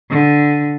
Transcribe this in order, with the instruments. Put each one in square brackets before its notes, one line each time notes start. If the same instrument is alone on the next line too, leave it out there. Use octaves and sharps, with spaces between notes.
[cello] D3